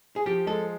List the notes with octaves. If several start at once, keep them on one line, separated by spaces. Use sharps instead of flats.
G#4
F3 G4
G#3 A4